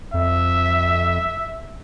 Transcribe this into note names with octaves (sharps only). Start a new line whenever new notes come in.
F2 E5